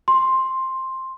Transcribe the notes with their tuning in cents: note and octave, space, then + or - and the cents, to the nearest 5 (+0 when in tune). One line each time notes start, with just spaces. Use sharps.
C6 +10